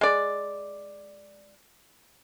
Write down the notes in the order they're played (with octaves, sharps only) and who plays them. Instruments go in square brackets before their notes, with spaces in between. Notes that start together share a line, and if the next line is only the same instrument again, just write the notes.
[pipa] G#3 D5